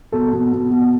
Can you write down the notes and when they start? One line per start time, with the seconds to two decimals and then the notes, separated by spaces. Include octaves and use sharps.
0.12 B2 A4
0.33 B2
0.53 B2
0.71 B2